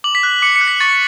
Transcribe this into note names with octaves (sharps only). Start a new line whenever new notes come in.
D6 F#7
B6
F#6
D6 C#7
C#7
F#6
B6
C#6 A6